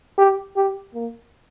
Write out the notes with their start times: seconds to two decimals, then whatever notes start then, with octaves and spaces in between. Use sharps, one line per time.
0.18 G4
0.56 G4
0.94 A#3